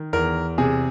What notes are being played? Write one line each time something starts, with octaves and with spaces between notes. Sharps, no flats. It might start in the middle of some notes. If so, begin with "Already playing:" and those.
Already playing: D#3
E2 A#4
C3 G#4